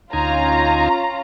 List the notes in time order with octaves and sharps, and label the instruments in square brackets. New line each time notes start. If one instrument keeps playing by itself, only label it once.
[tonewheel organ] D2 D#4 G#5 [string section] C#4 F4 [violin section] A#5